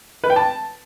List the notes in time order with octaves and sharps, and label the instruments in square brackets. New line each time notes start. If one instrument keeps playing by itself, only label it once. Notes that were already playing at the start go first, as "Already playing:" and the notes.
[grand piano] B4
G5
A5